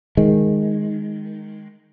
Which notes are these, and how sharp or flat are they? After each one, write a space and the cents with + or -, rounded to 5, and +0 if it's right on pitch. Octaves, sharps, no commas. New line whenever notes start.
D#3 +0 G#3 +0